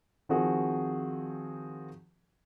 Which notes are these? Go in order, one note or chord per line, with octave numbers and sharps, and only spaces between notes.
D#3 F3 C4 F#4 G#4